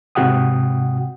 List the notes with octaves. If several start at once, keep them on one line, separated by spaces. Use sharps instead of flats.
G#2 C3 F#4 F#5 G5 D#6